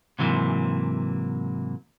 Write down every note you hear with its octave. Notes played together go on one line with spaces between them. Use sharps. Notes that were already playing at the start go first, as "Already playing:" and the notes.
G#2 C3 E3 F#3 A#3